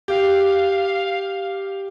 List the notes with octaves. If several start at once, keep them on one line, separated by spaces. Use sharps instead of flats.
G4 F5